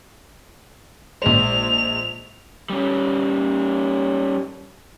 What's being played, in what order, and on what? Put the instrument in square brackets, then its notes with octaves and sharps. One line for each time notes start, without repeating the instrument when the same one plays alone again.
[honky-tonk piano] A#1 G#3 C5 [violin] F7
[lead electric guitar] G3 C#4